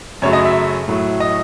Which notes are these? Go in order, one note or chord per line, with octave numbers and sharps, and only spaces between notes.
F#2 C#3 F#3 A3 C#5
D#5
E5
A2 F#3 A3
D#5